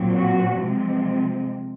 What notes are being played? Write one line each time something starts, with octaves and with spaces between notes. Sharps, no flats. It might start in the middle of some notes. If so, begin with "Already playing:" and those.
Already playing: A#2 F#3 C4
F#4
C3 F3 G#3 C4